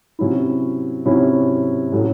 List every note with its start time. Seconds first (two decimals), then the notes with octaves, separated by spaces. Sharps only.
0.19 C3 F#3 C#4 E4
1.05 C3 F#3 C#4 E4
1.92 A2 F#3 A3 C#4